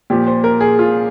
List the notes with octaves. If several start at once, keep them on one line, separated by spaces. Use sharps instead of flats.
A#2 F3 G4
C5
A#4
G#4
F4